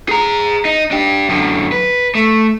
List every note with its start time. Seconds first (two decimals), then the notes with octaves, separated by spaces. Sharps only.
0.09 G#4 A#5
0.65 D#4
0.91 D4 G4
1.29 F#2 D3
1.72 B4
2.15 A3